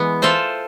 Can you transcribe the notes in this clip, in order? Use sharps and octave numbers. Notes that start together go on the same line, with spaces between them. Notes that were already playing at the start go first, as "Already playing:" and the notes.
Already playing: E3 G#3 B3
F4 A4 C5 E5